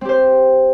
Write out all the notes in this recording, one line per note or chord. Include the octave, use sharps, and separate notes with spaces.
C4 G4 C5